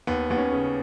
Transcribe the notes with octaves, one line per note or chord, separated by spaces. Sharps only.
D#2 B3
D#2 B3
C#4
C#3